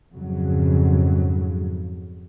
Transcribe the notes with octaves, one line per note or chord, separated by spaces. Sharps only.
F2 G#2 C#3 F#3